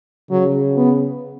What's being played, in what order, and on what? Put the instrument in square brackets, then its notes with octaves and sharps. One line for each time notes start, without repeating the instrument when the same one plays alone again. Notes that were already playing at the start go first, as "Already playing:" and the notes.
[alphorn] C#3 [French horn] F#3
[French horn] B3